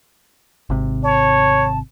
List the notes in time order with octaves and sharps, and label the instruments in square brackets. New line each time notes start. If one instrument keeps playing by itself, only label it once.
[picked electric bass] G#1 C3
[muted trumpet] C#5 [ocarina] A5